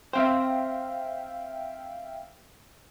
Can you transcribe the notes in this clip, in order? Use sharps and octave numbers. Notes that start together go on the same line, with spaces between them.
C4 C5 E5 F5 G5